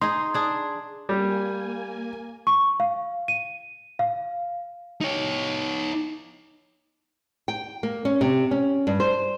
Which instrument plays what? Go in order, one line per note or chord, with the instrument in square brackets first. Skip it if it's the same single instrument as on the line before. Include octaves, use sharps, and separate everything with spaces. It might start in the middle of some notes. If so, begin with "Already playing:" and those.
[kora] D#4 G#4 [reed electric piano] C6
[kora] D4 G#4
[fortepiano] G3 [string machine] A#3 G#5
[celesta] C#6
F5
D#7
F5
[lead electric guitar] D#4 C#5
[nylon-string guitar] G5
A#3
C#4
C3
C#4
G2
C5